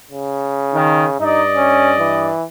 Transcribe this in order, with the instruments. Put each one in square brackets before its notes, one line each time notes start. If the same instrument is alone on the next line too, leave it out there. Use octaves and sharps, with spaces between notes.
[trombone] C#3
[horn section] D#3
[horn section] G2 D5 D#5 [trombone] D#4
[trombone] C#4
E3